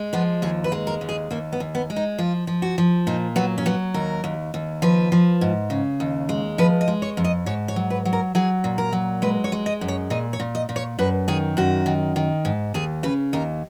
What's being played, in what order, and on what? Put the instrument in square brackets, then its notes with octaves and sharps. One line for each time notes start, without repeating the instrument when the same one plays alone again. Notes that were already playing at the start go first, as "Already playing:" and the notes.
Already playing: [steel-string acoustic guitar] G#3
F3 B3
D#2 G#4
B4
G#3
A#4
D#2
G#4
D#2 A#3
B3
D#2
B3
G#3
D#4
F3 F4
F3
F#4
F3
A#2 D#4
F#3 B3
C#4
F#3 B3
D#2 A#4
D#2
D#2
F3 B4
F3
G#2
C#3
D#2
G#3
F3 B4
D#5
G#3
C#5
F2
D#5
G#2 C#5
C#5
F#3
B4
F#3
A#4
F#3 G#4
A#2
A#4
F#3
G#3 B4
C#5
G#3
D#5
F#2
C#5
A#2 D#5
C#5
A#2
D#5
A#2
C#5
F#2 B4
D#3 G#4
F#2 F#4
D#3
D#3
G#2
D#2 G#4
C#3 B4
D#2 A#4